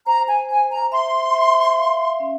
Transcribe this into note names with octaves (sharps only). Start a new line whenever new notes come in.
C5 A#5
G#5
C5 G#5
A#5
E5 C6
E5
F5
C#4